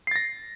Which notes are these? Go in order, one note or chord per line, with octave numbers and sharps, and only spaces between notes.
A6 A#6 C7